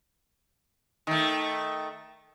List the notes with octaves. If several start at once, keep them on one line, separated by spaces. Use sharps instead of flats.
D#3 A3